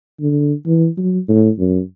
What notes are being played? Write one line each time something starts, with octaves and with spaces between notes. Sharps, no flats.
D3
E3
F#3
A2
F#2